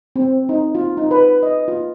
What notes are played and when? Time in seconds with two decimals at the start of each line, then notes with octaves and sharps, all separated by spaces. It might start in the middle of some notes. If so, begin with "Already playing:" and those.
0.16 C4
0.49 D#4
0.75 F4
0.97 D#4
1.11 B4
1.43 D#5
1.68 F4